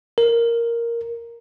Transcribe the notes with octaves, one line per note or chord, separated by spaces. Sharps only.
A#4